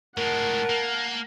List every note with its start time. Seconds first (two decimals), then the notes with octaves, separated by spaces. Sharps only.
0.17 A2 G#3 A#4 F#5 A5
0.70 A#3